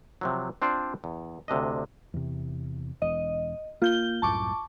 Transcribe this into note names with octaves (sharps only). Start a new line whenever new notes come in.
C3 F3 F#3
C4 D4 F4 C5 D5
E2
D2 C3 D4 D#5
E2 C3
E1 D#5
A#3 F4 G6 G7
C2 F#2 A2 A5 C#6 D6